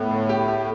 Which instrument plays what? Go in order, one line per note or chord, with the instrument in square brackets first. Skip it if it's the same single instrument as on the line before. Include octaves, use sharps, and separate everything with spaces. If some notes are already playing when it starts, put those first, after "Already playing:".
Already playing: [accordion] A2 [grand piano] B3
[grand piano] D3
G4
G4